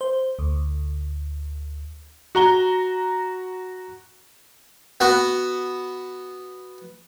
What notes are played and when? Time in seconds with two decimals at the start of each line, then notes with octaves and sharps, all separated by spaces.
0.01 C5
0.39 D2
2.35 F#4 A#5 G7
5.00 B3 F#4